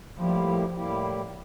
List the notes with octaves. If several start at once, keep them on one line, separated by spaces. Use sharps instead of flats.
A2 F3 G3 A#3 E4 G4
A2 G3 A#3 E4 G4